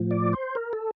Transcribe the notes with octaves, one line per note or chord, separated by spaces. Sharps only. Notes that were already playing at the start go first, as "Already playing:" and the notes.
Already playing: A2 F3
D5
C5
A#4
A4